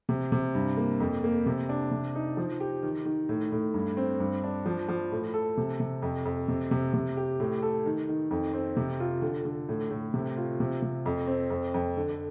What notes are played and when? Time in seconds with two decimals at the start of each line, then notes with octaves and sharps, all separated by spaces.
0.09 C3
0.32 C3
0.55 G2
0.77 A#3
1.00 F2
1.24 A#3
1.46 C3
1.69 D4
1.91 C3
2.15 D#4
2.37 F3
2.60 G4
2.83 D#3
3.05 D#3
3.29 A2
3.52 A2
3.74 G2
3.97 C4
4.20 G2
4.44 D4
4.66 F3
4.88 F3
5.12 A2
5.34 A4
5.57 C3
5.80 C3
6.02 F2
6.25 F2
6.48 C3
6.71 C3
6.94 C3
7.17 G4
7.40 A2
7.63 A4
7.86 D#3
8.09 D#3
8.31 F2
8.53 C4
8.77 C3
9.00 F4
9.22 D3
9.45 D3
9.69 A2
9.91 A2
10.14 C3
10.37 F4
10.60 C3
10.82 C3
11.06 F2
11.27 C4
11.50 F2
11.74 F2
11.97 D3